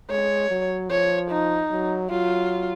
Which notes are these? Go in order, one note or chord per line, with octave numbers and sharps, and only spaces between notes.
G#3 C#5
F#3
F3 C#5
D#4
F#3
F#3 F4